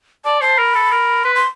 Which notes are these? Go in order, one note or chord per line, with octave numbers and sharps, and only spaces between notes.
D5 A5
C5 A5
A#4 B5
A4
A#4
B4 C6
C6